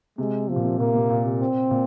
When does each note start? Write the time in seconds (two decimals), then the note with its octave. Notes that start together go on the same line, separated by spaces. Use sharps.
0.18 C3 G#3
0.49 C3 F3
0.56 A#2
0.64 C3
0.79 A#2 A#3
0.95 C3
1.10 A#2
1.25 C3
1.41 C4
1.71 A#2